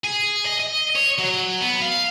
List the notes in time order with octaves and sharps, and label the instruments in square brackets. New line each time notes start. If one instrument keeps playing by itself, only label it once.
[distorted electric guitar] G#4
D#5
D#5
C#5
F#3
B3
F5